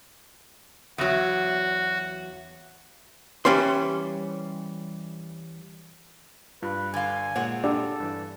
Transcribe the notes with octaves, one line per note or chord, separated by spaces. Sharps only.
E2 F#3 F#4
E3 G3 C#4 C5 C6
G2 F4 B4
D3 F5 G#5
A#2 G#3 C#5 F#5
D4 G4 A4 D5
G2 E3